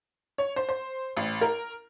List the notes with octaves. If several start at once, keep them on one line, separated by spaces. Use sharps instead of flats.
C#5
C5
C5
A1
A#4